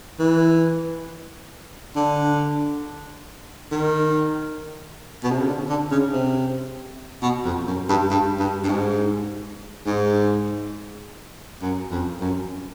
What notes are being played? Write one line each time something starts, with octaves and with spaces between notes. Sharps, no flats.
E3
D3
D#3
B2
C3
C#3
D3
D3
C#3
C3
B2
F2
F#2
G2
G2
G2
G2
G#2
G#2
F#2
F2
F#2